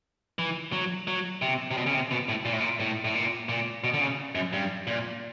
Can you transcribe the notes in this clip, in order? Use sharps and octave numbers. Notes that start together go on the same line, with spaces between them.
E3
F#3
F#3
C3
C3
B2
C#3
C3
B2
A2
A#2
A2
A#2
A2
A2
A#2
A#2
B2
D3
C#3
F#2
G2
A#2